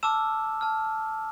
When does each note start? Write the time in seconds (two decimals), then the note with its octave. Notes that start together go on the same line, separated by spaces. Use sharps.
0.03 A5 D6 E6 F6 E7
0.61 A5 F6